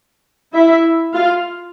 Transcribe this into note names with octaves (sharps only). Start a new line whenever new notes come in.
E4 E5
F4 F5